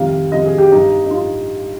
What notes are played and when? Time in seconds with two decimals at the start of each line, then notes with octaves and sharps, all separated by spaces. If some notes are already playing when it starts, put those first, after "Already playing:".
Already playing: F2 C3 D#3 G3 F5
0.32 F2 C3 D#3 G3 D#5
0.46 G#4
0.58 G4
0.72 G2 G3 D#4
1.06 D#4
1.11 G3 F4